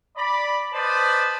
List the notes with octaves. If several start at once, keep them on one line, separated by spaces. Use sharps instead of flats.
D5 B5
B4 C5 D5 D#5 A5 B5